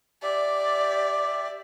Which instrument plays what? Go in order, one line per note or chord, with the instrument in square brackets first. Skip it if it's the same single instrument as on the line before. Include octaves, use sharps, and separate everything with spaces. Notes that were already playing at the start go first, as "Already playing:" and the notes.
[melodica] G4 E5 [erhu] D5